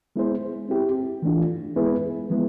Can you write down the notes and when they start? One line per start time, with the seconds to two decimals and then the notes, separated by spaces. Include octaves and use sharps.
0.16 G#3 B3 E4 G#4 C5
0.69 C4 E4 G4
1.22 E3 A3 D4 F4
1.76 G#3 B3 E4 G#4 B4
2.30 F3 G#3 B3 E4